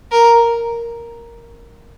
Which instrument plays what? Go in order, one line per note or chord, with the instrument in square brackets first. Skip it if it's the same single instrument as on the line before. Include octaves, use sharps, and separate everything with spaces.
[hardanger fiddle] A#4